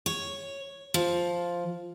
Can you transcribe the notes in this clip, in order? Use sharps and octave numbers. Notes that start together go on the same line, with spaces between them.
C#5
F3